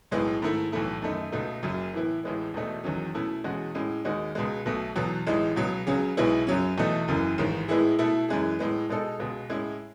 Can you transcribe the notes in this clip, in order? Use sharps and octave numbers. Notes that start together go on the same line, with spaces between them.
B1 A2 G#3 B3
G#2 D#3 A3 E4
B1 A2 E3 A3 E4
F#2 D#3 A3 D#4
C#2 B2 A3 D#4
F#1 F#2 C#3 F#3 C#4
A2 E3 B3 E4
A1 A2 G#3 B3
E1 E2 B2 A3 D#4
F#1 E2 D#3 F#3 C#4
B2 A3 C#4 E4
E2 B2 G#3 C#4 F#4
A2 G#3 C#4
D#2 D#3 G#3 D#4 F#4
C#2 B2 G#3
B1 B2 A3
E2 B2 F#3
A1 A2 G#3 D#4
C#2 B2 F#3
C#2 C#3 F#3 C#4 G#4
B1 B2 G#3 B3 E4
F#2 C#3 F#3 C#4
E2 B2 A3 D#4
F#1 F#2 C#3 E3
A1 G#2 D#3
A2 G#3 B3 E4 G#4
B2 A3 E4 A4
F#2 E3 G#3 C#4 G#4
A2 G#3 B3
B2 G#3 D#4 A4
C#2 B2 G#3
A2 G#3 C#4 E4